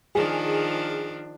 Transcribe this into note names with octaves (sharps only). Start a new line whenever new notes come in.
D#3 F3 D4 G#4